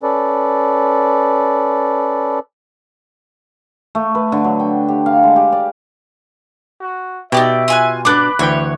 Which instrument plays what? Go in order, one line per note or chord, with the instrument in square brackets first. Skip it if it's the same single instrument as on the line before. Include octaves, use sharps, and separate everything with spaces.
[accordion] C#4 A4 B4 D5
[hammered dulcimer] A3
B4
D3
F#3
G5
G4
F5
G#3
G4
D5
[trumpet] F#4
[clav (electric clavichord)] B2 G4 [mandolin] D#4 D5 G5 [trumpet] E5
[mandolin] F4 G#5 F#6
[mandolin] B3 D4 [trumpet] B5 [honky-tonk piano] D6 F#6
[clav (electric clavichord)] D2 E3 G5 [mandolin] C#5